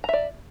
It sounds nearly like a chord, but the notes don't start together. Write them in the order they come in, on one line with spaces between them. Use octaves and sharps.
A#5 E5 D5